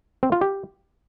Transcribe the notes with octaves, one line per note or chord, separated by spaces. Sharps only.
C4
F4
G4